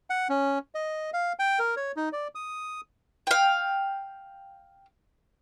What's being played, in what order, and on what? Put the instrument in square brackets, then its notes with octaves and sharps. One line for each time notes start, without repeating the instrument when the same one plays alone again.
[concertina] F#5
C#4
D#5
F5
G5
A#4
C#5
D#4
D5
D#6
[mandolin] F5 G5